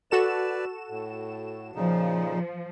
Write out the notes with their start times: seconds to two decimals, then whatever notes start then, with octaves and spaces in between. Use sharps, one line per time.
0.11 F#4 A4 B4 D5 E7
0.90 A2
1.75 A#2 C#3 F3 D#4